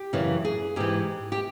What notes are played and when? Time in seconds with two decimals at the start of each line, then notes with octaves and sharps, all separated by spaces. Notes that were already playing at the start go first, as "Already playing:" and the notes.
Already playing: G4
0.13 F#2 C#3 E3
0.45 G#4
0.76 G#2 E3 G4
1.32 G4